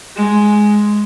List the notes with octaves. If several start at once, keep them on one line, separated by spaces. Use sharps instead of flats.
G#3